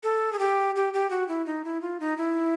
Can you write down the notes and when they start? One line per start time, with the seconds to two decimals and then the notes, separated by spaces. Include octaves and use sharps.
0.03 A4
0.33 G#4
0.39 G4
0.76 G4
0.94 G4
1.10 F#4
1.28 E4
1.46 D#4
1.65 E4
1.81 F4
2.00 D#4
2.18 E4